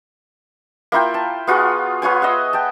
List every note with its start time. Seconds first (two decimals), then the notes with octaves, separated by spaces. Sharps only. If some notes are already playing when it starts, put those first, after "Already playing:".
0.92 A#3 E4 F4 G5
1.14 A5
1.47 B3 F4 F#4 G#4
2.02 B3 F4 C#5 G#5
2.22 D#5 E5 F#5
2.53 G5 A5